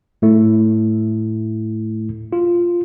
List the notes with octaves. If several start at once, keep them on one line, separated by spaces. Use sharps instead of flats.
A2 A3 E4
F4